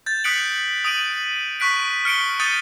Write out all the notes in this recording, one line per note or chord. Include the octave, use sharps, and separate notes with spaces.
G6 A6
D#6 F#6 B6 C#7 D7 F#7
D#6 D7 D#7 F#7
C#6 F#6 B6 D7
F6 C#7 D7 G7
D#6 G6 A6 C#7 D#7